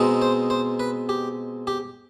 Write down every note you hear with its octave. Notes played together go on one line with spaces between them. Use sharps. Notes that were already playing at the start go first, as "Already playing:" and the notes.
Already playing: B2 G#3 C4 D#4
C5
C5
B4
G4
G4